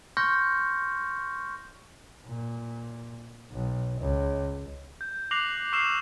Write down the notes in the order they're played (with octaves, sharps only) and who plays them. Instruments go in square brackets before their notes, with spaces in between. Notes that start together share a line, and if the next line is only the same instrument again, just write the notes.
[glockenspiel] C6 C#6 F6 G6 A#6 C#7
[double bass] A#2
B1
C#2
[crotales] G6
D6 F#6 A#6 C7 F7 F#7
C#6 E6 F6 C7 E7